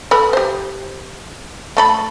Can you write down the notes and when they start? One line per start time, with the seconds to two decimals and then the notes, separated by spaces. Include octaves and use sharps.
0.11 A4 B4 B5
0.33 G4 C5
1.77 A3 A4 B5